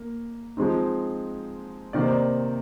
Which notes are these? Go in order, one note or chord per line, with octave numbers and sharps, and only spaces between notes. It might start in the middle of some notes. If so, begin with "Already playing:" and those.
Already playing: A#3
F3 G#3 C4 D#4
C3 D#3 A#3 D#4 D5
C5
D5